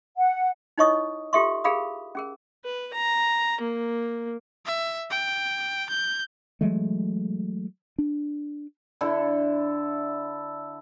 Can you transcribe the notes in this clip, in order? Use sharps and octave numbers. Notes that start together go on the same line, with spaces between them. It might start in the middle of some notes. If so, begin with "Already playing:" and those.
F#5
D#4 E4 C#5 D#5 C#6 D#6
F4 G4 A4 E5 C6 C#6
G4 G#4 A#4 F5 B5 D#6
C#4 G#4 A#4
B4
A#5
A#3
E5
G5
G6
E3 F#3 G#3 A3
D4
D3 E4 A4